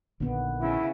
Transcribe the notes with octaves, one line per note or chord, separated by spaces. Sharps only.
A#1 D3 D#3 B3
C#3 E4